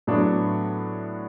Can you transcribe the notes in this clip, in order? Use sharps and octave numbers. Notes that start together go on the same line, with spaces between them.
A2 F#3 B3 D4 F#4